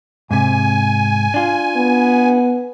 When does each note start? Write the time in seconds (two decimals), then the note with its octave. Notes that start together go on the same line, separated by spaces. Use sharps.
0.31 G#2 C3 G#5
1.34 D4 F4
1.76 B3